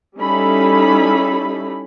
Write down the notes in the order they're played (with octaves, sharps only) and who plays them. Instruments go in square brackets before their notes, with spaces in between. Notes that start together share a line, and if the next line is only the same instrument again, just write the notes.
[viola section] G3 C#4 D#4 E4 A4 B5